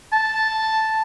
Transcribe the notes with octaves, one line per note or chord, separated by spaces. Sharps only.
A5